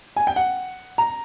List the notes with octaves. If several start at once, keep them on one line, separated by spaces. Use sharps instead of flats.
G#5
G5
F#5
A#5